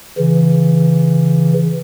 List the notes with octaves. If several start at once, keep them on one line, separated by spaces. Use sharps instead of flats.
C#3 E3